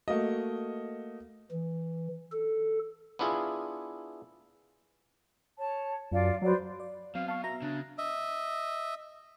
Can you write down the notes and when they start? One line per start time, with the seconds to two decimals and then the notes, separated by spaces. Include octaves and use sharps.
0.08 A3 A#3 F#4 D#5
1.52 E3
2.32 A4
3.19 B3 D4 E4 F4 G#4
5.58 C#5 A5
6.12 F#2 F4 D5
6.42 F#3 B4 C5 D5
6.80 D5
7.15 B2 F#3 B3 C4 F5
7.28 F5 A5 C#6
7.44 B3 F#4 E5 A#5
7.62 C#3 D4
7.98 D#5 E5